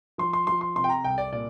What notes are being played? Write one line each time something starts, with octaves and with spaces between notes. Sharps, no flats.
F3 C6
C6
F3 C6
C6
C3 C6
G5
A#5
C2 G5
D5
A#2 D5